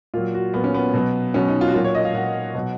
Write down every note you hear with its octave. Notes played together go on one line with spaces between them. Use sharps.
A#2 F#3 F4
F#4
A#2 F#3 B3
C#4
B3
B2 F#3
B2 F#3 C#4
D#4
F4
F#4
A#2 F#3 F4
C#5
D#5
F5
A#2 F#3 F#5
B2 F#3